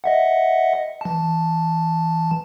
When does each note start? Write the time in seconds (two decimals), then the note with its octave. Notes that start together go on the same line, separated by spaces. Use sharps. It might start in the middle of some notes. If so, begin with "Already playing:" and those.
0.04 D#5 E5 F#5
1.01 E3 A5